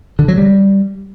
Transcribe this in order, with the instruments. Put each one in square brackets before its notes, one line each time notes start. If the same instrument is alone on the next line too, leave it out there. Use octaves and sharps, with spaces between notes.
[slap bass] D3
F#3
G3